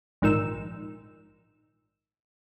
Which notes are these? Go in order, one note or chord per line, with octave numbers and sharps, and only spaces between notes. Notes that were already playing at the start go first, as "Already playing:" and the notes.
A#1 G#2 D#3 E6